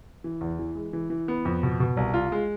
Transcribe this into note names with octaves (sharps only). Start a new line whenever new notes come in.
E3
E2
E3
G#3
E3
E3
B3
F2
B2
B2
C2
F4
G#3